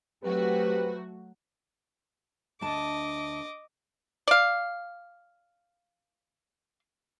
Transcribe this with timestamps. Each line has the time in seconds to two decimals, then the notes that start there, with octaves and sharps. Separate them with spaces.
0.23 F#3 A3 C4 F#4 G4 B4
2.61 D2 D4 D#5 A5 D6
4.28 D5 F5